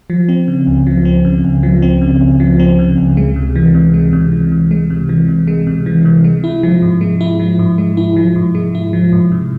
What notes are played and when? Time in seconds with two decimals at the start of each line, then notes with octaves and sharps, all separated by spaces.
0.10 F3
0.29 C4
0.48 C#3
0.67 C#2
0.87 F3
1.05 C4
1.25 C#3
1.44 C#2
1.63 F3
1.82 C4
2.01 C#3
2.21 C#2
2.40 F3
2.60 C4
2.79 C#3
2.98 C#2
3.17 G#3
3.36 C3
3.56 E3
3.74 C3
3.94 G#3
4.13 C3
4.32 E3
4.52 C3
4.71 G#3
4.90 C3
5.09 E3
5.28 C3
5.47 G#3
5.67 C3
5.86 E3
6.05 C3
6.24 G#3
6.44 E4
6.63 F3
6.82 G#2
7.01 G#3
7.21 E4
7.39 F3
7.59 G#2
7.78 G#3
7.97 E4
8.16 F3
8.36 G#2
8.55 G#3
8.75 E4
8.93 F3
9.12 G#2
9.32 C3